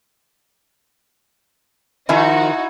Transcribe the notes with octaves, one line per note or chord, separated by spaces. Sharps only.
D#3 F3 D#4 E4 F#4 G#5